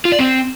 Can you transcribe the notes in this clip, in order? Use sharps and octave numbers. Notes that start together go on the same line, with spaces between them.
F4
D5
C4